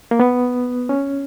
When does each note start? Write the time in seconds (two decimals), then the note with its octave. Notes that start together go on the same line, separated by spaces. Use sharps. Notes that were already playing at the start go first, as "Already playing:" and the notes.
0.11 A#3
0.20 B3
0.89 C#4